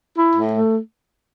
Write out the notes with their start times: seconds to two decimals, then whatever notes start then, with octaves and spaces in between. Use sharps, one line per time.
0.17 E4
0.35 A2
0.54 A3